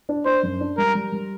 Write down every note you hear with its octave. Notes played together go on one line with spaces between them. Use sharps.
D4
D4 C5
F#2
D4
G3 A#4
G3
G3